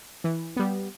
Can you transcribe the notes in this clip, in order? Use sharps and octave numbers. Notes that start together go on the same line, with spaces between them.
E3
G3 B3